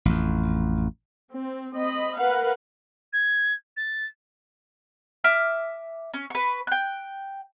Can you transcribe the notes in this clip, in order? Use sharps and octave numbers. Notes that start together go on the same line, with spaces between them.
A1 F2
C4
C4 D#5 B5
A#4 B4 F5 F#5
G#6
A6
E5 D6 F6
C#4
B4 C#6
G5 F#6